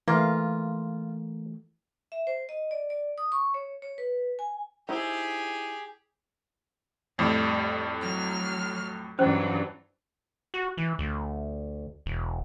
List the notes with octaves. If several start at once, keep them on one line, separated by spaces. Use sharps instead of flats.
E3 A3 A#3 F4
E5
C5
D#5
D5
D5
D#6
C#6
C#5
C#5
B4
G#5
D#4 E4 G4 G#4 C5
F2 A2 G3
F#3 F6
G2 E3 F#3 C#4 C5
F#4
E3
D2
E1